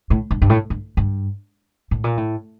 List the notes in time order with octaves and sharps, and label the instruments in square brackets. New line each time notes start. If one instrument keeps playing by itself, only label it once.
[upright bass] A2
G2
G2
A2
G2
G2
A2
A#2
A2